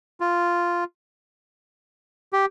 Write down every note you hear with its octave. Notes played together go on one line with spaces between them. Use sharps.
F4
G4